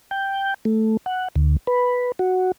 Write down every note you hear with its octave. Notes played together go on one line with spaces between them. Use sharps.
G5
A3
F#5
D2
B4
F#4